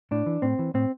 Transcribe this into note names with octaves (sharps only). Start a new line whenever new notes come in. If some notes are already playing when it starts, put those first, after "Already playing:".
A2 D4
E3
A2 C4
E3
A2 C4